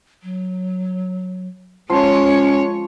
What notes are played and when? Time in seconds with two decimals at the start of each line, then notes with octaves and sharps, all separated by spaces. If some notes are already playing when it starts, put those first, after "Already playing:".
0.23 F#3
1.90 F3 G#3 C#4 C#5 C6